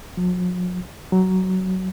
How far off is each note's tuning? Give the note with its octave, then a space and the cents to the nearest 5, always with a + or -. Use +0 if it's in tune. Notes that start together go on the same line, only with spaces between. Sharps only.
F#3 -45
F#3 +15